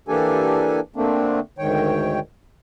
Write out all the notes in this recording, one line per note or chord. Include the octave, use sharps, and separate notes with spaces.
E3 A#3 D4 G4 A4 G#5
D3 A3 A#3 C4 D4
D2 G#2 D#3 C#5 G5